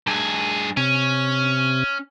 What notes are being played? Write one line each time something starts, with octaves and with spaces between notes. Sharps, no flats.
G2 G#4
C3 C#4